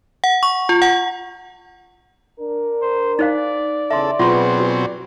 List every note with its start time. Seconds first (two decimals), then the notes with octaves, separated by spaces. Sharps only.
0.24 F#5
0.43 C#6
0.69 F4
0.82 F#5
2.39 D4 A#4
2.82 C5
3.19 D#4 C5 D5 F5
3.90 E2 C#3 A4 E5 C6
4.19 B2 F#3 C4 F4 G#4 B4 C6
4.60 F#4